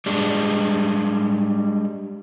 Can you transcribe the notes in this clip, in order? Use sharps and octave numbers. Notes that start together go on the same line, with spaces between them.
G3 G#3 D4